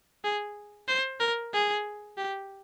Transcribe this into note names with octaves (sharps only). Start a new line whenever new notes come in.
G#4
C5
A#4
G#4
G4